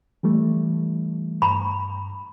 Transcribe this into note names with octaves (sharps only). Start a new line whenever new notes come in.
E3 G3 A3
G2 A#5 B5